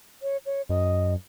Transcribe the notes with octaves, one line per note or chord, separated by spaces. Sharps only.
C#5
C#5
F#2 D#5